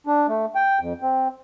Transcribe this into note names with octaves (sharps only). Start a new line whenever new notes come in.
D4
A3
G5
F2
C4